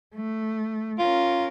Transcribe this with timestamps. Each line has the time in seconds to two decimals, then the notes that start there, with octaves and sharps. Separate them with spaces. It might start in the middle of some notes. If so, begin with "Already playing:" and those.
0.15 A3
0.99 C#4 F4 A#4